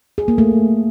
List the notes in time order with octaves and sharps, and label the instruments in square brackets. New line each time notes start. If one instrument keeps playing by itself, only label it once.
[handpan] G#4
A#3
A3